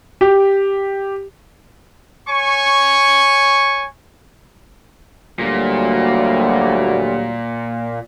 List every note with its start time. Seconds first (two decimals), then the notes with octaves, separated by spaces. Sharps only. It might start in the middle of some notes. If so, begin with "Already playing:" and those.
0.21 G4
2.28 C#5 G#5 C#6
5.39 D2 A#2 F#3 G3 A#3